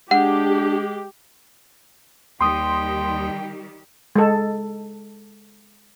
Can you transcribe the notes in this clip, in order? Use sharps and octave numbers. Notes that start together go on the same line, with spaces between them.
G#3 D4 G4 F#5
D#2 D#3 G3 G4 G5 C6 D#6
G#3 A4